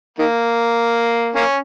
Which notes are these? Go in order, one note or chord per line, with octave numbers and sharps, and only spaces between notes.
D#3 A#3
A#3 C#4